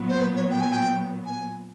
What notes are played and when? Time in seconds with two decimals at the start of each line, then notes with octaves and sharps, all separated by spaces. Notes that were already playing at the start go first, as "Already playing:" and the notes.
Already playing: A#2 F#3 B3
0.09 C5
0.21 B4
0.36 C#5
0.50 G5
0.61 G#5
0.72 G5
1.26 G#5